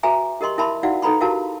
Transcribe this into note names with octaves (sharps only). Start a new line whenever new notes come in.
F#4 G#4 B4 E5 G#5 A#5
G4 A#4 D#5 C6 C#6
E4 A#4 E5 A5 B5 C6
D#4 E4 F#4 D5 F5 F#5
D#4 A4 B4 A#5 B5 C#6
E4 F#4 G4 A#4 F5 A5